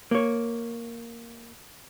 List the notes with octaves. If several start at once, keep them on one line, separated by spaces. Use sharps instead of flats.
A#3 C#5